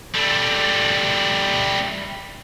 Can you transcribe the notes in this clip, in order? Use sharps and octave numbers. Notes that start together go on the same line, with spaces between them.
G3 A3